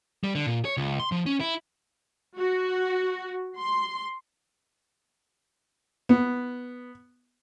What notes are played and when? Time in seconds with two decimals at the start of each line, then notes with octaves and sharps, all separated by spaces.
0.24 G3
0.35 D3
0.47 A#2
0.65 C#5
0.77 C#2
1.00 C6
1.12 F3
1.26 C#4
1.40 E4
2.38 F#4
3.58 C6
6.09 B3